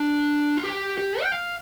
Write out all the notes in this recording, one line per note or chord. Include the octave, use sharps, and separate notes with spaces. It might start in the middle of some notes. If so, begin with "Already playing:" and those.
Already playing: D4
F4
G4
G4
G5
F5